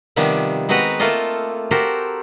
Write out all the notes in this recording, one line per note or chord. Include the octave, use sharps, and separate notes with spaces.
C3 D#3 F3 G3 B3
G#3 B3 C4 F#4 B4 A#5
A3 A#3 F4 A4 D#5
F#4 G4 A4 A#4 C5